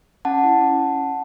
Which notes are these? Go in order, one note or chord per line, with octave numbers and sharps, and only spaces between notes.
C#4 F#5 A5
E4
C#4